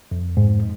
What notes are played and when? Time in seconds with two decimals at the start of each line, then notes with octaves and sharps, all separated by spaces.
0.11 F2
0.37 G#2